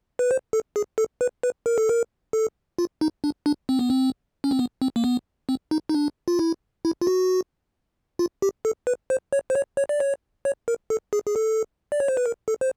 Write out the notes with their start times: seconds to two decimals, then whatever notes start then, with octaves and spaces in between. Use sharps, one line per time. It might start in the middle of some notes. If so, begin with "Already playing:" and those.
0.19 B4
0.31 C5
0.53 A4
0.76 G#4
0.98 A4
1.21 B4
1.43 B4
1.66 A#4
1.78 A4
1.89 A#4
2.33 A4
2.79 F4
3.01 D#4
3.24 D4
3.46 D4
3.69 C4
3.79 B3
3.90 C4
4.44 C#4
4.51 C4
4.59 B3
4.82 C4
4.96 A#3
5.04 B3
5.49 C4
5.71 D#4
5.89 D#4
5.95 D4
6.28 F4
6.39 E4
6.85 E4
7.01 F4
7.07 F#4
8.19 F4
8.42 G4
8.65 A4
8.87 B4
9.10 C5
9.33 C#5
9.50 C5
9.55 C#5
9.77 C#5
9.89 D5
10.00 C#5
10.45 C#5
10.68 A#4
10.90 A4
11.13 G#4
11.27 G#4
11.36 A4
11.92 D5
12.00 C#5
12.08 C5
12.17 B4
12.26 A#4
12.48 A4
12.61 C5